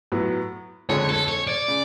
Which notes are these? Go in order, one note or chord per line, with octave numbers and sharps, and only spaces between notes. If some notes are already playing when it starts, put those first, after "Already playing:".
A2 F#3 B3
F2 D3 G#3 C#5
A4
C#5
D5
C#3